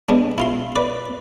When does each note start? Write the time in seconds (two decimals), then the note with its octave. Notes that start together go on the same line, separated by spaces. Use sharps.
0.09 G#3 B3 D4
0.38 E4 F4 C6
0.76 B4 D5